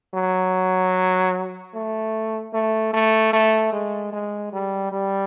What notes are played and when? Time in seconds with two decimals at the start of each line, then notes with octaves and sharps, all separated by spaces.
0.14 F#3
1.74 A3
2.53 A3
2.93 A3
3.33 A3
3.73 G#3
4.13 G#3
4.53 G3
4.92 G3